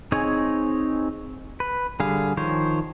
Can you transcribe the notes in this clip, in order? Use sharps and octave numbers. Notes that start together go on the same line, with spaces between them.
C4 D#4 G#4 C#5 G#5
B4
D3 G3 G#4 F5
D#3 F3 C5 C#5